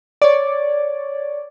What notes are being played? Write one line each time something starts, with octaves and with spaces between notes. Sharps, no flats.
C#5 D5